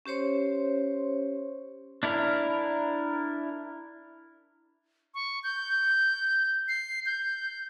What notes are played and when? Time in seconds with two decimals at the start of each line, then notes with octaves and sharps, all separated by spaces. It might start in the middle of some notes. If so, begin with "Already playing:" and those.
0.06 C#4 G4 C5 C#5 C6
2.03 D4 E4 A#4
5.14 C#6
5.43 G6
6.68 C7
7.06 G6